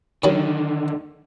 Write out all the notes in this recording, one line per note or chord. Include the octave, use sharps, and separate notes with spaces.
F#2 D3 D#3 F#3